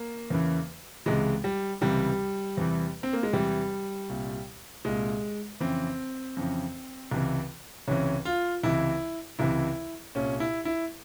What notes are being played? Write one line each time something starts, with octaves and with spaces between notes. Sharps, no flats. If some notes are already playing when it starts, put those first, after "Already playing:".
Already playing: A#3
E2 C#3 E3
C#2 C3 E3 G#3
G3
C#2 C3 E3 G3
E2 C3 E3
C4
A#3
G#3
E2 C3 E3 G3
C2 A#2
C2 A#2 G#3
F2 C#3 E3 C4
F2 C#3 E3
C#2 C3 E3
C#2 C3 E3 C#4
F4
C#2 C3 E3 E4
C#2 C3 E3 E4
C2 A#2 C#4
E4
E4